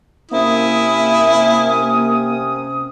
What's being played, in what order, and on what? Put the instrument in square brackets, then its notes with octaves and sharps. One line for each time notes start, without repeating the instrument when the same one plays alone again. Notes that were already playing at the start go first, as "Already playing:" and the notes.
[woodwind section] C3 C#4 D#6 [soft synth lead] A#3 [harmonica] E4